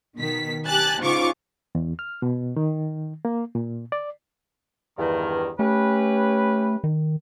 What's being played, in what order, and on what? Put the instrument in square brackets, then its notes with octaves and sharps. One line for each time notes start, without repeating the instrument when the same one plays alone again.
[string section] B2 D#3 B6
G4 G#5 A5 F#6 A6
G#2 C#3 F4 C#6 D6
[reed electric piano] E2
F6
B2
D#3
A#3
A#2
D5
[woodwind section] E2 G2 D#3
[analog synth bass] A3 [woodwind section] C#4 G4 B4
[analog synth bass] D#3